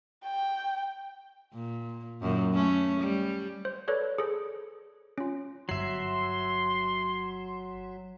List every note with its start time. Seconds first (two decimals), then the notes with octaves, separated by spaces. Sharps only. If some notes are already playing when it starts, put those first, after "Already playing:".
0.24 G5
1.54 A#2
2.21 F#2 A#2 D#3
2.53 A3 C#4
3.00 G3
3.65 C5
3.88 A4 B4 C#5 D5
4.18 G#4 A4 C5
5.18 C#4 F4
5.69 G1 F#3 E5 C6 C7